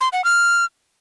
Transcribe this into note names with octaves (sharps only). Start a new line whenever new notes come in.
C6
F#5
F6